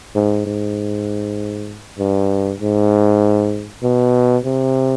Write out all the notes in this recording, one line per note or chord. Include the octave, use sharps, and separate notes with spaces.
G#2
G#2
G2
G#2
B2
C3